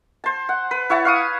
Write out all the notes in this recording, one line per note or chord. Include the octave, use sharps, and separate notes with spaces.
C5 A5
F#5
B4
E4 C#5 F#5 A5
F5 C#6 D#6